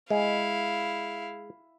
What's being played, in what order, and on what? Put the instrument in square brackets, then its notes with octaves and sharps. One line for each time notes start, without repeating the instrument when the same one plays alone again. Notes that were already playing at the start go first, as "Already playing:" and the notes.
[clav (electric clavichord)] G#3 [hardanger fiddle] E4 F5